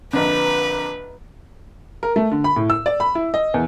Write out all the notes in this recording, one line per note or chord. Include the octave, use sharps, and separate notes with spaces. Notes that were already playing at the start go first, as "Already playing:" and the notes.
A#1 F2 D3 B4
A#4
A3
D3
B5
A2
E6
D5
B5
E4
D#5
E2